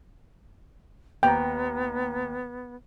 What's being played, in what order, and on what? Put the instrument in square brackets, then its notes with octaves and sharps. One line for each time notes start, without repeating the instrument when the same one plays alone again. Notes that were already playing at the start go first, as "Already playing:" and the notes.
[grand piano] D#2 A#5 [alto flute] B3 [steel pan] G5